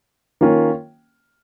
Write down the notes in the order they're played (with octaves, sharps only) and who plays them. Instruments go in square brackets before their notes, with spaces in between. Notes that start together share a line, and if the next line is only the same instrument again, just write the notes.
[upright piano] D#3 A#3 C#4 F4